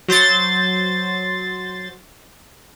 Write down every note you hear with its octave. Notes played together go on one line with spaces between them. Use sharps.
F#3 C5 C6 A6